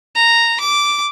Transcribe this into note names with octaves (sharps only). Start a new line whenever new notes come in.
A#5
D6